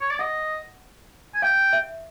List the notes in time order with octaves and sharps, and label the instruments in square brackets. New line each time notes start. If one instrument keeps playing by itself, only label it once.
[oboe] C#5
D5
[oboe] D#5 [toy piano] F#5
[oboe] G#5
[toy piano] F5 [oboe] G5
[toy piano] E5